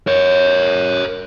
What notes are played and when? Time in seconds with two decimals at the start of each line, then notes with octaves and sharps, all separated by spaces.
0.07 A#4 C#5